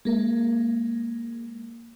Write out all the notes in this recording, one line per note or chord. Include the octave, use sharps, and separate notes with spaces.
G#3 A#3